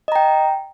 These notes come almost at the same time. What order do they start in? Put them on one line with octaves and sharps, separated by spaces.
D#5 A#5 G5